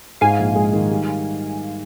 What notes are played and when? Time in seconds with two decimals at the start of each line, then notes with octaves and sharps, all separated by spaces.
0.21 G#2 F5 G#5
0.39 A#1
0.56 G#3
0.73 D#3
0.90 G3